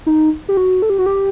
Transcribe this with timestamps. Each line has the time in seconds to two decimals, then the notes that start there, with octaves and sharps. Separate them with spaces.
0.06 D#4
0.49 G4
0.57 F#4
0.82 A4
0.90 G4
0.99 F#4
1.06 G4